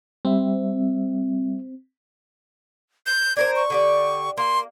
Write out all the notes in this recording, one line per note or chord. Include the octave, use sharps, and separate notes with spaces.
G3 C4 E5
G6
D4 A#4 C5 G#6
C#6
D3 G4 D5
A#3 C6